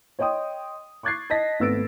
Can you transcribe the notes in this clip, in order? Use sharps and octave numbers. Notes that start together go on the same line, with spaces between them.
C#5 D#5 G5 C6 D#6
C#6 D6 F#6 G#6 A6 C7
D#5 A5 A#6 B6
G#1 A3 B3 E6 A6 D7